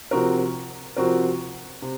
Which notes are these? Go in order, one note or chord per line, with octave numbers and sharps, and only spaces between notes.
C3 F3 C4 F#4 A#4
C3 F3 C4 F#4 A#4
C3